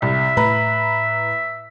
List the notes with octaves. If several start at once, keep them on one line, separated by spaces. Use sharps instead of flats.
C2 E5
A2 B4 A#5 B5